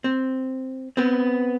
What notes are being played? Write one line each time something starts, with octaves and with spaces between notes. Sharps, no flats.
C4
B3 C4